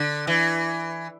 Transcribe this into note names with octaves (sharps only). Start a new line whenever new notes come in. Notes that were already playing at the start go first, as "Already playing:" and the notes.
Already playing: D3
E3